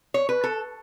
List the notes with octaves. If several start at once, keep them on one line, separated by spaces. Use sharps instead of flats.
C#5
B4
A4